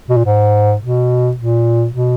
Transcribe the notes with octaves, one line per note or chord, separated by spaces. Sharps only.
B2
A#2
G#2
B2
A#2
B2